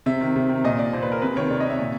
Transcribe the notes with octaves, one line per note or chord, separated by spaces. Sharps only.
C3 E5
D#3
C3
D#3
A#2 D#5
D5
A#2 C5
B4
A#4
C3 B4
D#3 C#5
C3 D5
D#5
D#3
E5
A#2